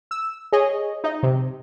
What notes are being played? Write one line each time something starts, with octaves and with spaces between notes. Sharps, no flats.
E6
G#4 C#5 D#5
D#4 D#5
C3